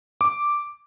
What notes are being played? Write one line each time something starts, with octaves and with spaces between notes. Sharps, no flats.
D6